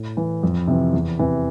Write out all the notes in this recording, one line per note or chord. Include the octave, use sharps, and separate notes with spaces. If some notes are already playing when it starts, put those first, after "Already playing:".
Already playing: A2
E3
F2
C3 E3
E2
C3 E3